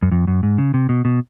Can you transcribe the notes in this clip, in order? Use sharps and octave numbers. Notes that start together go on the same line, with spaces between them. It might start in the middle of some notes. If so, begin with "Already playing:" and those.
F#2
F2
F#2
G#2
C#3
C3
B2
B2